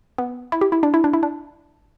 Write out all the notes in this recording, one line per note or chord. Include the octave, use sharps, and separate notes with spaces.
B3
E4
G4
E4
D4
E4
D4
E4
D4